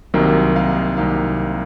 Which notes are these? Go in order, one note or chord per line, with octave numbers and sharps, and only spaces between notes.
C2 C3 D#3 F#3 A#3
F5
C2 C3 D#3 F#3 A#3 F5